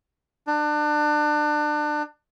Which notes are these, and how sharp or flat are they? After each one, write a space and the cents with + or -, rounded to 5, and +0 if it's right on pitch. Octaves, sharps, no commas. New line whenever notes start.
D4 +30